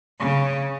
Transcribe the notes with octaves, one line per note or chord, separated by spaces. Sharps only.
C#3